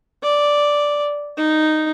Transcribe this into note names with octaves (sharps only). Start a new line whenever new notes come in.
D5
D#4